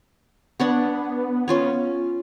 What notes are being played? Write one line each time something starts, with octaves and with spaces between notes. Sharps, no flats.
B3 D4 C#5 F#5
C#4 F4 C#5